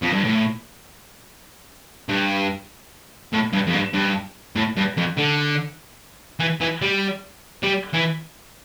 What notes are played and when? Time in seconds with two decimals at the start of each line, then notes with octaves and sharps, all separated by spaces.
0.02 F2
0.13 G2
0.25 A2
2.09 G2
3.33 A2
3.53 G2
3.67 F2
3.73 G2
3.93 G2
4.55 A2
4.76 G2
4.97 F2
5.17 D3
6.40 E3
6.61 E3
6.82 G3
7.63 G3
7.94 E3